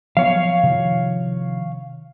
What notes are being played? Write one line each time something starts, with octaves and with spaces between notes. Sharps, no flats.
F3 F#3 B3 C#5 F5
C3 D#3 F3